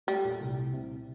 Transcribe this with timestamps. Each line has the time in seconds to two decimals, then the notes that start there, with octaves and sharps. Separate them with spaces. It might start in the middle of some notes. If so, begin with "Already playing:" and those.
0.07 G3 A3
0.24 A#2
0.40 C2
0.57 C2
0.73 C3